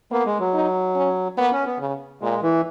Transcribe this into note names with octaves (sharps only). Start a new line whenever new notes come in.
A#3 B3
G#3
F#3
D#4
C#4
A#3 B3
C#4
B3
C#3
A#2 G#3
E3